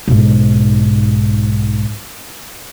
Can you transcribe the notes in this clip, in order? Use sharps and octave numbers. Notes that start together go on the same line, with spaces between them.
B1 G#2